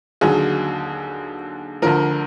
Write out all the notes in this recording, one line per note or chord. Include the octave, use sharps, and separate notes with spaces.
D#2 D3 F#3 G#4
D2 D3 F3 A#4